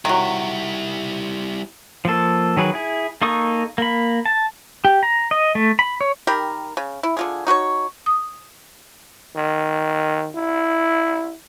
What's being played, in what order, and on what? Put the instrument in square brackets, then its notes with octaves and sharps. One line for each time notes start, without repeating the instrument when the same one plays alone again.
[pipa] D#3 F#3 [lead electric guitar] G3 E4
[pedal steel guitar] F3 A#3 A4
D#3 F#3 G#4 B4
E4 G#4
A#3 D#4 A4 C#6 D#6
A#3 B5
A5
G4
A#5
D#5
A3
B5
C#5
[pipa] D#3 G4 A#4 B5
C#3
E4
D3 F4 G#4
D#4 F#4 B4 C#5
[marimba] D#6
[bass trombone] D#3
E4